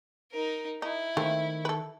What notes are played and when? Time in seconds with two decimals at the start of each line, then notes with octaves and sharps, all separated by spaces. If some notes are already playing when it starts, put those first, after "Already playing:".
0.31 D#4 A#4
0.82 D#4 E4
1.17 D#3 A3 A#3 C4
1.65 A4 B4